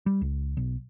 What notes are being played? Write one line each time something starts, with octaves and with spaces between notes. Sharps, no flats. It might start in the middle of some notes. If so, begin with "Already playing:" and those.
G3
C#2
B1